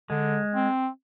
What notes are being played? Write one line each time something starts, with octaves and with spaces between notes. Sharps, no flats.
D3 G#3
C4